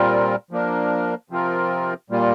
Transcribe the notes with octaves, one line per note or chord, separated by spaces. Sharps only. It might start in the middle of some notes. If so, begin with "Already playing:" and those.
Already playing: A#2 G3 C4 F4 A#4
F3 A#3 D4 A#4
C3 F3 C4 F4 A#4
A#2 G3 A#3 F4